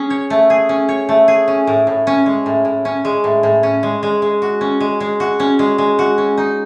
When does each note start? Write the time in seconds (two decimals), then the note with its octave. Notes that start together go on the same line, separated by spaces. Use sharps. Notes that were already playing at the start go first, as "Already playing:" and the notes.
Already playing: C#4 G#4
0.10 C#5
0.30 A3
0.50 G#4
0.69 C#4
0.89 C#5
1.09 A3
1.28 G#4
1.48 C#4
1.67 A2
1.87 A2
2.07 C#4
2.26 G#3
2.46 A2
2.65 A2
2.85 C#4
3.05 G#3
3.24 A2
3.43 A2
3.63 C#4
3.83 G#3
4.03 G#3
4.22 G#3
4.42 F#4
4.61 C#4
4.80 G#3
5.00 G#3
5.20 F#4
5.40 C#4
5.59 G#3
5.78 G#3
5.99 F#4
6.18 C#4
6.38 D#4